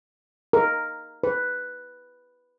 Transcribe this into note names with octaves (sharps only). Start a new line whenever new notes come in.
A#4
B4